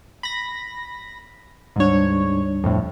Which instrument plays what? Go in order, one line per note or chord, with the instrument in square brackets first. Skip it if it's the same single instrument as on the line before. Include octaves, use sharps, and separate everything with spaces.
[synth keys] B5 A#6
[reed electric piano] D2 G3 D4 [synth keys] G#2 C#5
[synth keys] F2 A2